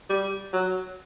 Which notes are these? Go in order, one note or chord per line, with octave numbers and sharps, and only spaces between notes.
G3
F#3